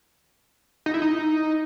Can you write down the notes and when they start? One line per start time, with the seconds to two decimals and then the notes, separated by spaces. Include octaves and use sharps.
0.86 D#4
0.94 E4
1.02 D#4